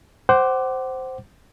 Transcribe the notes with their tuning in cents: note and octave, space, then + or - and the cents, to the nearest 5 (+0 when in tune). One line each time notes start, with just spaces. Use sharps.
C5 +0 F#5 +30 D6 +0